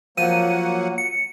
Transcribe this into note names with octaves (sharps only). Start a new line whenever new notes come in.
F3 F#3 A#3 F#5 D#7
C#7